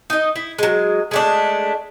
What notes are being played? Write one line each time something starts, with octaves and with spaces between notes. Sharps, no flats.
D#4 D#5
E4
F#3 G#3
G#3 A3 D4